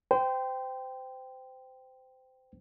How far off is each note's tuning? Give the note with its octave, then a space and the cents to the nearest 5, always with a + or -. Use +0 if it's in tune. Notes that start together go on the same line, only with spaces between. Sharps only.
C5 -25 G5 +0